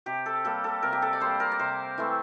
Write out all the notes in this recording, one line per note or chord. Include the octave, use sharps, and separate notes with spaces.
C3 G4
A4
G3 A#3 A4
A4
C3 A#4
G4
A4
D5
G3 A#3 C5
A#4
D5
C3 C5
E3 A3 C4